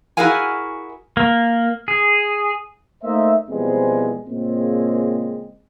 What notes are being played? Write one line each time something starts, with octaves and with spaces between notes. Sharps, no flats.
E4 F#4 G#4 A#4 F5 G#5
A#3
G#4
A3 A#3 D#4 C5 D#5 E5
B2 E3 F3 G3 G#3 C4
A#2 C#3 G#3 C4